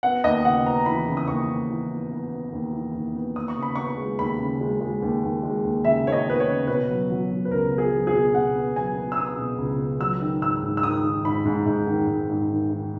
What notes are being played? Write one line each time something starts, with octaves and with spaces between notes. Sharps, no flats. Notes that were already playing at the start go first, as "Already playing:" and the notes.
B3 F#5
D#2 D#5
C#3 F#5
B3 A#5
E3 B5
C#3
D#6
D#2 C#6
D#2
E3
B3
B3
B3
D#2
E3
D#2
B3
D#2 D#6
C#6
C#3
B5
B3 C#6
G#3
D#2 B5
C#3
G#3
G#3
D#2
D#2
G#3
D#2
C#3 E5
D#2 C#5
D#5
B3 B4
C#5
C#3
B2 B4
F#3
F#3
F#3
B4
C#2 A#4
B3
G#4
F#3
G#4
B2
B2 F#5
B3
F#3 G#5
B3
E6
B3 D#6
B2
C#2
B3
F#3 E6
D#3
G#2 E6
G#2
E6
D#3 D#6
D#3
G#2 B5
G#2
G#2
D#3
G#2
G#2
D#3
D#3